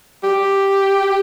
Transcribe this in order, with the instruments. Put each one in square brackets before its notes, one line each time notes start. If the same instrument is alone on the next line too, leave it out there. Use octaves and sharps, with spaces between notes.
[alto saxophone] G4